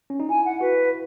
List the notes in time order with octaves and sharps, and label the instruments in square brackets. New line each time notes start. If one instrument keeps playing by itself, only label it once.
[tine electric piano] C#4
D#4
[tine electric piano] E4 [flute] G#5
[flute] F#5
[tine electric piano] F#4 [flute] B4